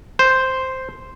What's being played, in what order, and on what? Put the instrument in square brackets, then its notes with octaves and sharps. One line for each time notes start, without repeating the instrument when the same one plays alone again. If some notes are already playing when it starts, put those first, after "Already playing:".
[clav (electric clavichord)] C5